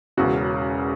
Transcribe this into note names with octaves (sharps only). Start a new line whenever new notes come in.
E1 E2 C#3 F#4